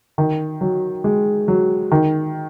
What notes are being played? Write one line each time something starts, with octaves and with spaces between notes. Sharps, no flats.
D#3
F#3
G#3
F#3
D#3